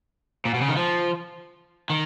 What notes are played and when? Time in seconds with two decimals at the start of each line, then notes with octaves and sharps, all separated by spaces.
0.45 A#2
0.54 B2
0.61 C#3
0.68 D#3
0.76 F3
1.90 D#3